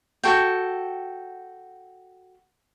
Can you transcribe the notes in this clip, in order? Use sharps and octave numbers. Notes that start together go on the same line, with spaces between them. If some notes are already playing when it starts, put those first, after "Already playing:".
F#4 A4 G5